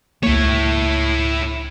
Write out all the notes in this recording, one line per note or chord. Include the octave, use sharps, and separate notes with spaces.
C#2 A3 A#3 E4 C#5